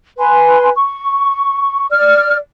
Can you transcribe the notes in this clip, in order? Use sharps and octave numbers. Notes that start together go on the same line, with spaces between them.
B4 G#5 C6
C#6
D5 F6